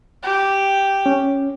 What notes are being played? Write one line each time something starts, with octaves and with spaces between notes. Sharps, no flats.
G4
C#4